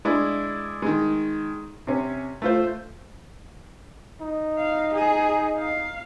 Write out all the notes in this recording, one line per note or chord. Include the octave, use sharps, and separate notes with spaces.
G#3 D4 E4
D#3 G#3
C3 C#4
A3 F4 C5
D#4
F5
G#4
F5